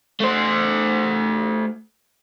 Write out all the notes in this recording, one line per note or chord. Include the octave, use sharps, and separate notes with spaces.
A3 C5